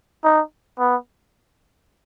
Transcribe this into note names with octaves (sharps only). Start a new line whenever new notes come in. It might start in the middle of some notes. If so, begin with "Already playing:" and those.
D#4
B3